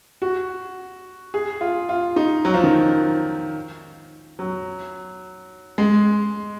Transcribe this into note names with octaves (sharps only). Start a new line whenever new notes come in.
F#4
G#4
F4
F4
D#4
F#3
F3
D#3
F#3
G#3